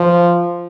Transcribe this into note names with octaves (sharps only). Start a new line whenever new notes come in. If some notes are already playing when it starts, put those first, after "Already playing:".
Already playing: F3